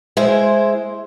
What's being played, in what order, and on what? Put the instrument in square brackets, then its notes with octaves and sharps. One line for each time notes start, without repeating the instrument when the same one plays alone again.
[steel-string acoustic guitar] G#3 E4 C5